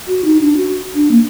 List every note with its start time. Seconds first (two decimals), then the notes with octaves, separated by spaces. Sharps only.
0.08 F#4
0.25 D#4
0.41 D4
0.57 F#4
0.95 D4
1.11 A#3